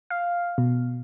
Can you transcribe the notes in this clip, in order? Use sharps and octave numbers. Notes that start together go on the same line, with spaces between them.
F5
B2